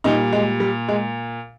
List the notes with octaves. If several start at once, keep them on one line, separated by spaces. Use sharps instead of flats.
A#2 G3 D#4
G#3
G3
G#3